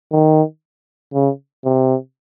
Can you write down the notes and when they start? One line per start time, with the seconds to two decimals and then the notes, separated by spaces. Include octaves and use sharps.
0.12 D#3
1.14 C#3
1.65 C3